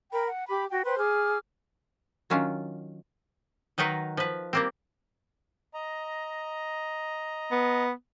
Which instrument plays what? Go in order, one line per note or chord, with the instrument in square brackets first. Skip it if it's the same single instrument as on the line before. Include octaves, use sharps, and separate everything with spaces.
[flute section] A#4 G5 B5
F#5
G4 B5 D6
F#4 G5
B4 C5 G5 C6
G#4 D6 F6
[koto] D#3 F#3 C#4 D4 F4
D#3 F#3 D#4 A#4 B4
F3 B4
G3 A#3 C4
[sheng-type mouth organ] D#5 A#5
[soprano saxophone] B3